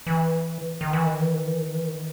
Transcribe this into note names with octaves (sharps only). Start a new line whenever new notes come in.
E3
D#3
E3
D#3
E3
D#3
E3
D#3
E3
D#3